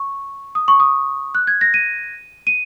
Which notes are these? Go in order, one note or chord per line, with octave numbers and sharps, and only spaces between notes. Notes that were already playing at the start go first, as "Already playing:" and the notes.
Already playing: C#6
D#6
C#6
D#6
F#6
G#6
A#6
D#7
D#7